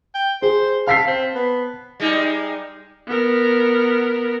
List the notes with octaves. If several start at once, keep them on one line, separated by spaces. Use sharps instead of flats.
G5
G#4 C5
F5 A5 B6 C7
C4
B3
G3 G#3 D#4
B3 A#4